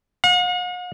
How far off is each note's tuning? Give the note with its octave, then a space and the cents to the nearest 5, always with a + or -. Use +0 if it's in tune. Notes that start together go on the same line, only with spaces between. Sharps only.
F#5 -45